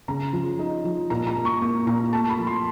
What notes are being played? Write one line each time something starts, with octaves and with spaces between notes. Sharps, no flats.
C#3 A#5
F3
D#4
F3
A#2 A#5
A#5
A#3
C#6
A#3
A#2 A#5
A3 A5
B5
F3
C6